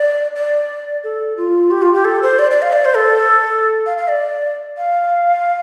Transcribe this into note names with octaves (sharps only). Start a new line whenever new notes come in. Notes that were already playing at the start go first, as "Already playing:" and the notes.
Already playing: D5
D5
A4
F4
G4
F4
G4
A4
C5
D5
D5
F5
D5
C5
A4
F5
F5
D5
F5